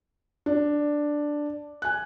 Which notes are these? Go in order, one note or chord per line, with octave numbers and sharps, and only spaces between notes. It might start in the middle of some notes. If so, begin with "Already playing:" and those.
D4
G#5 F#6